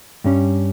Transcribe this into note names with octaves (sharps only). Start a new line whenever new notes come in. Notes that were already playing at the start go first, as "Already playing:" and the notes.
G2 G3 C#4